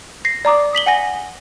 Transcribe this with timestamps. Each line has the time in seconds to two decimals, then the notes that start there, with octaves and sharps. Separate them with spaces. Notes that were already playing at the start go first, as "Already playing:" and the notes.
0.25 A#6 C7
0.45 D5 A#5 D6 D#6
0.73 D#6 B6 F#7 G7
0.86 F#5 G#5 A#6